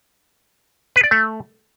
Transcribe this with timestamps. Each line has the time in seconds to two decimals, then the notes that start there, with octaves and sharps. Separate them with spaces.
0.96 B4
1.04 D5
1.11 A3